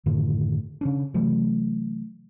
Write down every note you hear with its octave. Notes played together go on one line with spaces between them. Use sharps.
F#2 A2 D3 D#3
C#3 C#4 D4
C3 E3 F#3 A3